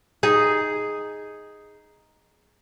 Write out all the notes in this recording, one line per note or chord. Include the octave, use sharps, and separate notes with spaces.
D#4 G#4